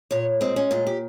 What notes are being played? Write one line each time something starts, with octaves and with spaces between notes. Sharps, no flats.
A#2 C#5
G#3 C4
C#4
A#2 F4
G4